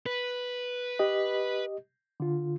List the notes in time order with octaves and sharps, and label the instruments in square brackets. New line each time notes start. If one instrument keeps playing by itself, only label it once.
[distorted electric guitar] B4
[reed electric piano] G4 D#5
D3 F4